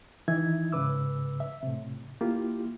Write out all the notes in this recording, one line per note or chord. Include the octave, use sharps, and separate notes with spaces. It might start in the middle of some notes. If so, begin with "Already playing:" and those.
D#3 E3 D#4 E4 E5 G#6
G#2 C#3 B4 D6 E6
E5
A2 C3
A#3 E4 F4 G4